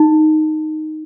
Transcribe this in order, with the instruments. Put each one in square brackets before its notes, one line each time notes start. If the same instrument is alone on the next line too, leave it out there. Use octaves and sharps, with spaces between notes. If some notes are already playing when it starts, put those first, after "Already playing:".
Already playing: [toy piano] D#4